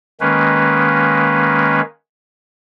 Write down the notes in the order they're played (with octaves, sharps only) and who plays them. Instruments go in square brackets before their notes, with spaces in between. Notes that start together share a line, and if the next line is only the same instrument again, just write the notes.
[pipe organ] D#3 G#3 A#3 C#4 B4